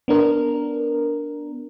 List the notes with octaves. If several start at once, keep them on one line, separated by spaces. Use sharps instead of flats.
B3 D4 A#4